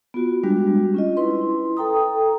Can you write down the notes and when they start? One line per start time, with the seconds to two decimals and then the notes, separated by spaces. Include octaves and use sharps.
0.14 B3 F4 F#4
0.43 G3 G#3 D4 F#4 G4
0.94 C#4 F4 D#5
1.17 E4 B4 C6
1.77 A4 G5 A#5 D#6